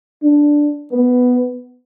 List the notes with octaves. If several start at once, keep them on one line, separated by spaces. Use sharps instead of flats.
D4
B3